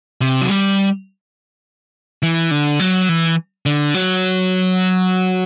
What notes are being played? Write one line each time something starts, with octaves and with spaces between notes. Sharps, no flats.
C3
F#3
G3
E3
D3
F#3
E3
D3
F#3